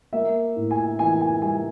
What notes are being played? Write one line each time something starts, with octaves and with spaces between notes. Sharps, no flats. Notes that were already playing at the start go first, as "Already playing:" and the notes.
A#3 E5
A2
G#5
E3 G#5
G#5
G3 G#5